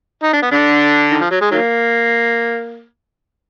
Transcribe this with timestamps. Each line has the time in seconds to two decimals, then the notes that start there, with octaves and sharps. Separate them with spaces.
0.23 D#4
0.33 D4
0.42 B3
0.51 D3 D4
1.11 D#3
1.20 F3
1.31 F#3
1.41 G#3
1.51 D#3 F#3 A#3